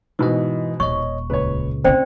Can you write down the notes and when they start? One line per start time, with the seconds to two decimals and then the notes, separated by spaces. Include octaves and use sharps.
0.19 G#2 B2 E3 D#5
0.80 D#1 C#5 D#5 C#6
1.30 C#2 A#2 C#3 B4 C#5
1.84 C4 C#4 D#4 C5 D5 G5